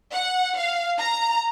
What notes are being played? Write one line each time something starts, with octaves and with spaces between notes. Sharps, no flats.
F#5
F5
A#5